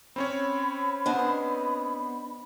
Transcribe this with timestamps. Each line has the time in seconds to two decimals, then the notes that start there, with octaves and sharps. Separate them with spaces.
0.16 C4 C#4 C#5 B5
1.06 B3 D4 C5 D#5